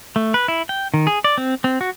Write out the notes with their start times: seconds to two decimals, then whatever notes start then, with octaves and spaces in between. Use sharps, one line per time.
0.16 A3
0.34 B4
0.48 E4
0.69 G5
0.94 D#3
1.07 G#4
1.24 D5
1.38 C4
1.64 C4
1.81 F#4